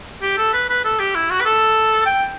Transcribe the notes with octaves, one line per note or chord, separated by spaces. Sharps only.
G4
A4
B4
B4
A4
G4
E4
F#4
B4
A4
G5